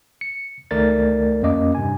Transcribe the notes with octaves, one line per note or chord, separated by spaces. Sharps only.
C#7
C#2 D#3 A3 A#4 D5 A6
F2 A#3 C#4 D#5 D6
G2 C3 G#5